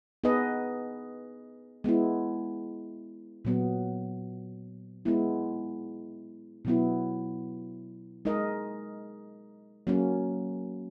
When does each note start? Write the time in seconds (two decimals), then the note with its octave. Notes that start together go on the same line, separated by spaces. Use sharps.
0.24 B3 D#4 G#4 B4 D#5
1.84 G#3 B3 E4
3.45 A#2 F#3 B3
5.05 G#3 B3 E4
6.65 B2 F#3 B3 E4
8.25 G#3 D#4 A#4 D#5
9.87 F#3 A#3 C#4